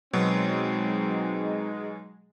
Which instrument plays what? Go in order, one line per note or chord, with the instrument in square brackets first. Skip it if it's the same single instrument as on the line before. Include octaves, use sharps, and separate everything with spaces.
[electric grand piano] B2 F#3 [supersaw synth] G#3 [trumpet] C4 [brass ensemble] D#4